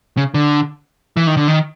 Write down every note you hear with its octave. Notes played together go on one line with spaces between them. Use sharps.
C#3
D3
E3
D#3
D3
D#3